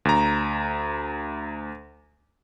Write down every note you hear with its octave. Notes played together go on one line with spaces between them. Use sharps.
D2 A#5